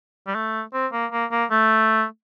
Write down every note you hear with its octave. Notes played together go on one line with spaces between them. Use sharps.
G3
A3
C4
A#3
A#3
A#3
A3